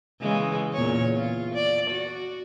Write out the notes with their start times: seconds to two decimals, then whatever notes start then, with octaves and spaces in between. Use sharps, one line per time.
0.21 C#3 E3 G#3
0.74 E2 A#2 C#5
1.16 F4
1.55 D5
1.90 F#4